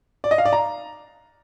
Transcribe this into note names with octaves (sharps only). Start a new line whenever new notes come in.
D5
D#5
F5
D5
A#5